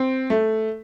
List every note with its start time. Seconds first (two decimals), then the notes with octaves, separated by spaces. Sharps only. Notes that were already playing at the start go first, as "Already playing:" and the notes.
Already playing: C4
0.30 A3